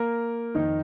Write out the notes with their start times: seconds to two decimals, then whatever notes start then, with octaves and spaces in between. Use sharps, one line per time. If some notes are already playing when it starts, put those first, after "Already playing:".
Already playing: A#3 A#4
0.55 F2 D#3 D#4